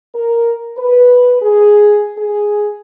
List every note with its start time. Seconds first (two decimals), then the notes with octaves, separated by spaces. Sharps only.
0.15 A#4
0.78 B4
1.42 G#4
2.17 G#4